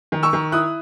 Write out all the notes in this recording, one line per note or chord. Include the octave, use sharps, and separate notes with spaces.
D#3
C#6 E6
D#3
E4 D#6 F#6